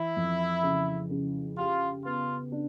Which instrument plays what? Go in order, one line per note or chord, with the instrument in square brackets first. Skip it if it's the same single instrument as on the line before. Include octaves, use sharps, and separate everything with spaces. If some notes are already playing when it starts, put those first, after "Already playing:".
Already playing: [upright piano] E3 [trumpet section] E4
[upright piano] F2
C#3
C#3
[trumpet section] F4 [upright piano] G4
[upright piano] B3 [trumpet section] F4
[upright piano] D4